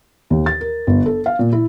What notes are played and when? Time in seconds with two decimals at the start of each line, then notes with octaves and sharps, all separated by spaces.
0.30 D#2
0.46 A6
0.61 A#4
0.87 G1
1.06 A4
1.26 F5
1.39 A#2
1.53 E4